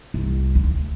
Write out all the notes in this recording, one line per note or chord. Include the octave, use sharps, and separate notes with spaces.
C2
D2